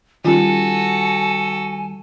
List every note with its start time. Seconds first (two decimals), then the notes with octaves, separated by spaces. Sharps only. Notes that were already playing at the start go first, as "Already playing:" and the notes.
0.25 D#3 G3 C#4 F4 F#4 A4 G#5